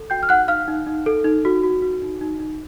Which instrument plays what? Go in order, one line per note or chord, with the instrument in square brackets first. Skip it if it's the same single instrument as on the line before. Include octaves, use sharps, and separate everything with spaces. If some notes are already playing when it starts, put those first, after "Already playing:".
Already playing: [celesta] A4
F#4 G5 G6
F6
D#4 F#5 F#6
D#4 F5 F6
D#4
D#4
A4
D#4
F#4
F#4
F#4
D#4
D#4
D#4